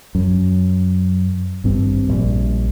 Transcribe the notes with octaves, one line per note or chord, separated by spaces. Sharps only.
F#2
G#1 G2 C4
A#1 G3